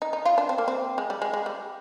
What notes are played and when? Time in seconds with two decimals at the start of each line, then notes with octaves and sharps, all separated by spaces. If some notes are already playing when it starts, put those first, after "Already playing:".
0.02 D#4
0.13 D#4
0.25 F4
0.38 D4
0.49 C4
0.58 A#3
0.68 C4
0.98 G#3
1.10 G3
1.22 G#3
1.33 G#3
1.46 G3